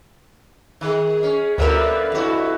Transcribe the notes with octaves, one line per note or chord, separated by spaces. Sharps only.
D#3 G#4
C#4
D2 D3 G3 A#3 B3 A#4 B4 E5
F2 E4 F#4